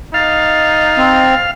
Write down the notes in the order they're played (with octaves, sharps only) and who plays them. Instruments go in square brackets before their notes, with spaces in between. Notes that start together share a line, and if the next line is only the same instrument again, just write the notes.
[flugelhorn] D#4 [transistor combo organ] F5 [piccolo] A6
[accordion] C4